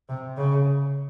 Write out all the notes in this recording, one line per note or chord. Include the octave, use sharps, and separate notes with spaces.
C3
C#3